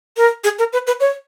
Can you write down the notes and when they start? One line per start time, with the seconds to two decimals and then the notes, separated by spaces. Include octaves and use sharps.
0.17 A#4
0.44 G#4
0.59 A#4
0.73 B4
0.87 B4
1.00 C#5